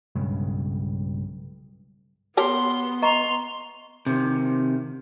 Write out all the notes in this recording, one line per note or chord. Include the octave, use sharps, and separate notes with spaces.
B1 G2 C#3 G#3
B3 G4 A#4 C#5 C6
D#5 A#5 C6 C#6 F7
C3 D#3